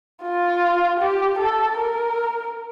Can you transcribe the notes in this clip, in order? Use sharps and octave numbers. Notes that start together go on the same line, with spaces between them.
F4
G4
A4
A#4